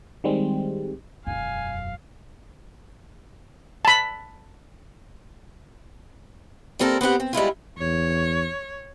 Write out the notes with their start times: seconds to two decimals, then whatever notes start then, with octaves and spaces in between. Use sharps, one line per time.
0.24 D#3 G3 G#3 C4
1.27 E1 F#2 F5 G#5
3.85 A5 B5
6.79 G3 A#3 C4 A4 A#4 C5
7.01 B3 C4 G4 F#5
7.20 C4
7.33 G3 G#3 E4 F4
7.78 E2 C#5